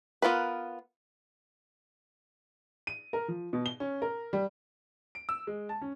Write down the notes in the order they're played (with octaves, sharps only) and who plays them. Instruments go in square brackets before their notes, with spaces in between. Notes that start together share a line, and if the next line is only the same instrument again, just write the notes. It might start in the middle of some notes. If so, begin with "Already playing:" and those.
[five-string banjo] B3 F4 A#4 B4
[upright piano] D#7
A#4
F3
B2
G7
C#4
A#4
G3
[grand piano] D7
E6
G#3
A5
C#4